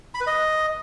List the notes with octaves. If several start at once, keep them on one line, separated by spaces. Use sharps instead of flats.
B5
B4
D#5